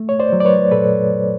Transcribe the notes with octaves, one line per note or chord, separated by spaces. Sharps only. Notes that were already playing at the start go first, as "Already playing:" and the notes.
Already playing: A3
C#5
C5 D5
F#3
D5
B4 C#5
A#2 A4 B4